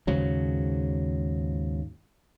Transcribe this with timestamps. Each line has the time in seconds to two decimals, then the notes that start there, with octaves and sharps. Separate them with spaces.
0.07 D#2 G#2 C#3 F#3